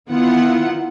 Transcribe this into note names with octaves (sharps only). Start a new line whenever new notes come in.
D#3 B3 E4 F4 F#5